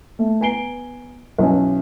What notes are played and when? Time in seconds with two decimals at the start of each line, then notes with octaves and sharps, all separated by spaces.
0.19 A3
0.41 B3 G#5 A#5 C7 D7 G7
1.38 B1 E3 C#4 G#5